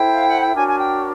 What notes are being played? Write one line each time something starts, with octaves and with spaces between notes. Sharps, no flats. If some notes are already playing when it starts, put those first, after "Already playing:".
Already playing: E4 A4 C5 G5
F5
F#5
G5
D4 F#4 A#4 C#5 G#5
G#5
G5